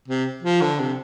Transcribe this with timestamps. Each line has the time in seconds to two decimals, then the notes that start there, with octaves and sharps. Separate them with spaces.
0.08 C3
0.43 F3
0.61 D3
0.80 C3